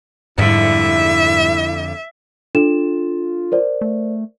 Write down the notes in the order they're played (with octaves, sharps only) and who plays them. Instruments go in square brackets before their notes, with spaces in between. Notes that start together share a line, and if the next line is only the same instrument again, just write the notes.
[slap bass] F2 D3 [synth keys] G#2 G3 [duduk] E4 [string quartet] E5
[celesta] D4 A4 E7 [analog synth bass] F4
[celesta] A#4 C5 D5
[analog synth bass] A3